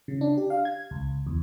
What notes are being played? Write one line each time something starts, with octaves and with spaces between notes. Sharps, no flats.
C#3
D4
G4
F5
G#6
C#2
E2